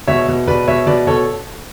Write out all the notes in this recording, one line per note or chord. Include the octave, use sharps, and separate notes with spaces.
B2 C#5 E5
B2
B2 B4 D5
B2 C#5 E5
B2 B4 D5
B2 A4 C#5